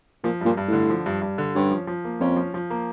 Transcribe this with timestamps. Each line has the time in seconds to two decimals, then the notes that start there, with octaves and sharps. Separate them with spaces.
0.24 A#2 F3
0.41 G2 A#2
0.57 G2
0.68 A2 D3
0.90 F3
1.06 G2
1.22 G2
1.38 D3
1.55 G2 C#4
1.71 F3
1.87 F3
2.05 A#3
2.20 F2 C#4
2.36 F3
2.54 F3
2.70 A#3